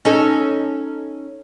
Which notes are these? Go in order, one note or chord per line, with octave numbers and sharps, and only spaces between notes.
C#4 D#4 A4